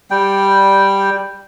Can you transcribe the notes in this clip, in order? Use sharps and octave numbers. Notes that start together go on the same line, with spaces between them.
G3 G5